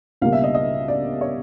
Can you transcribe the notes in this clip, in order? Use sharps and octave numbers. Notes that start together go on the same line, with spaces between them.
C#2 B2 G3 A#3 F5
E5
D#5
D#5
D5
C#5